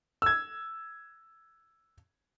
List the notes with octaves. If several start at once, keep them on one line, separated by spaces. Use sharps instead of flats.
E6 G#6